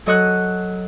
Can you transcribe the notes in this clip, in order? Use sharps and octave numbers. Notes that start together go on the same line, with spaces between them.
F#3 A4 D#5 C#6 F#6